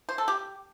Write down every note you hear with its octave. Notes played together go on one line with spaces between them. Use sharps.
C5
A4
G4